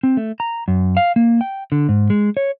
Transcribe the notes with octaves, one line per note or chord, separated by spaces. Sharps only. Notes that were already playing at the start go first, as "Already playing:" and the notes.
C4
A3
A#5
F#2
F5
A#3
G5
D3
G#2
G#3
C#5